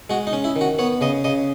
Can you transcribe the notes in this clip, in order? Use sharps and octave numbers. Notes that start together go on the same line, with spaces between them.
G#3 F#4
D#4
C#4
E4
D#3
F#4
B3 C#5
C#3 D#5
C#3 D#5